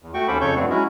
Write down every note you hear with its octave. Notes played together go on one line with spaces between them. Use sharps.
E2
A3 F#4 G5 C#6
D#2 C#4 A4 C5 B5 D6
F2 C#3 A4 C#5 C#6 G6
G2 F3 A3 B3 C4 D4
F#3 G#3 C#4 E4 F#4